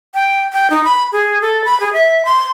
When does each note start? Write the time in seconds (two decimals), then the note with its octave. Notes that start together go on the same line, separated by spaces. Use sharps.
0.14 G5
0.53 G5
0.70 D#4
0.84 B5
1.12 G#4
1.41 A4
1.65 B5
1.80 G#4
1.93 E5
2.25 C6